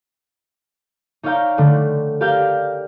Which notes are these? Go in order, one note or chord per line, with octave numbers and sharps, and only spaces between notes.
D#4 C#5 D5 F5 G5 A#5
D3 A3 D4
G4 A#4 D5 F5 G5